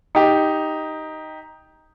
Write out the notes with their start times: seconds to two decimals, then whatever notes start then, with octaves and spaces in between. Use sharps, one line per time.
0.15 D#4 G4